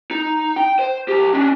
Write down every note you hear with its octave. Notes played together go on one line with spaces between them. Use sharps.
D#4
G5
C5
C2 G4
C#4 D4